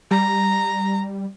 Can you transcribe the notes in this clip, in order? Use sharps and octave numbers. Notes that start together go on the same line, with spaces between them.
G3 A#5